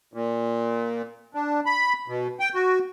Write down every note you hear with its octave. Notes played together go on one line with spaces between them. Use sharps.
A#2
D4
B5
B2
G5
F#4